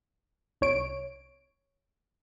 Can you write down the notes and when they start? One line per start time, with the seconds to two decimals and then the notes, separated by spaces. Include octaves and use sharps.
0.61 C2 C#5 D7